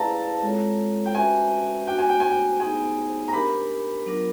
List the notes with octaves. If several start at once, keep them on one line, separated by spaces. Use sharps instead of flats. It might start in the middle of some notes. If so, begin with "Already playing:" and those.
Already playing: E4 G#4 B4 D5 F5 A5 A#5
G#3 C4 F4 A4 C#5
G5
C#4 F#4 B4 E5 G#5
B3 D4 F#4 G5
G#5
G5
G#5
G5
B3 D#4 G#4 G#5
A#5
D4 G4 A#4 B5
F#3 B3 D4 F4 A#4